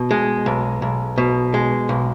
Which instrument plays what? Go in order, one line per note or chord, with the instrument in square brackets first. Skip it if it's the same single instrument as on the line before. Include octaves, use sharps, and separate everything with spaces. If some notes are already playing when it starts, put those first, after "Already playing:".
Already playing: [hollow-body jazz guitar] B2
G#3
B1
B1
B2
G#3
B1